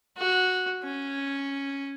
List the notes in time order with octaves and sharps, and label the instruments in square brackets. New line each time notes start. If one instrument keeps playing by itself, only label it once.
[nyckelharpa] F#4
C#4